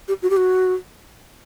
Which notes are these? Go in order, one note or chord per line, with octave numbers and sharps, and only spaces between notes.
G4
F#4
G4
F#4